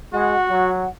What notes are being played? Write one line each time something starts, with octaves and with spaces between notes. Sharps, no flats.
G#3 F#4 F#5
F#3